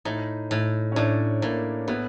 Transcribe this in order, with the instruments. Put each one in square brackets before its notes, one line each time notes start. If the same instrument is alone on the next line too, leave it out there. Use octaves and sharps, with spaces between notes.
[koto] A2 [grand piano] D#4
[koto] A2
[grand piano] C#4
[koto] A2 [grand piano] D4
[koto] A2 [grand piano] A#3
[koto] A2 [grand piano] B3